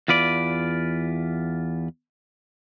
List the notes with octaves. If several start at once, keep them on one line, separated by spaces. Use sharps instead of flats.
E2 F4 B4 D5